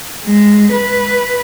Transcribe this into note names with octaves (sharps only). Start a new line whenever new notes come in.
G#3
B4